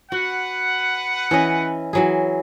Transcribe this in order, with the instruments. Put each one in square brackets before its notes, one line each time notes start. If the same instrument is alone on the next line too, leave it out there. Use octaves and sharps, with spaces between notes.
[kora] F#4 [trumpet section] B4 F#5
[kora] E3 C#4 D#5
E3 F#3 G#4